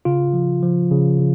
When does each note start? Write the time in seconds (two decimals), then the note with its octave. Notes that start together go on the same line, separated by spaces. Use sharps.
0.05 C#3 F4
0.33 F3
0.63 F3
0.91 C#3
1.19 C#3